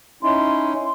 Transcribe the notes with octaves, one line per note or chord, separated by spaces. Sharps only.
C#4 D#4 E4 C6